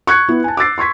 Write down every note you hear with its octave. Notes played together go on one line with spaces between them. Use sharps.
C#6 F#6 G#6 C#7
B3 E4
G#5 A5
D6 E6 A6 C7
C6 C#6 G#6 B6